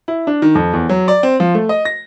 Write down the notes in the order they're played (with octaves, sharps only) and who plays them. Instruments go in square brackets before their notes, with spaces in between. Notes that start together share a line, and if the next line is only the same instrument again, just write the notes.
[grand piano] E4
D4
D#3
F2
E2
F#3
D5
C4
F3
A3
D#5
A#6